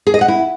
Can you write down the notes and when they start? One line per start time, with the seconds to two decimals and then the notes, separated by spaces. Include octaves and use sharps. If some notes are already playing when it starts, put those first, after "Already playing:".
0.07 G#4
0.14 D#5
0.21 F#5
0.28 E4